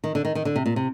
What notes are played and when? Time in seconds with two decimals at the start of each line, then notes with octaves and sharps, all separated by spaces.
0.04 D#3
0.15 D3
0.25 D#3
0.35 D#3
0.45 D3
0.56 C3
0.66 A#2
0.76 C3